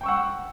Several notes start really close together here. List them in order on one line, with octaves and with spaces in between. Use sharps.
G5 C#6 E6 F#5